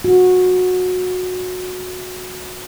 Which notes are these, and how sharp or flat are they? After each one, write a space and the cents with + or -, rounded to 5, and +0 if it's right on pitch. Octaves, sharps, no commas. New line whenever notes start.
F#4 -20